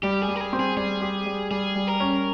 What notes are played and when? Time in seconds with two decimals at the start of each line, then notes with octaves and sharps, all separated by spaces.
0.03 G3 G4
0.22 G#4
0.28 G3
0.36 A#4
0.41 G#4
0.53 C4
0.59 G#4
0.77 G3 G#4
1.01 G4
1.26 G3
1.51 G3 G#4
1.75 G3
1.87 A#4
2.00 C#4